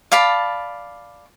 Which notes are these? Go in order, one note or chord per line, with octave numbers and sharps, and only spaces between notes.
D5 F5 A5 B5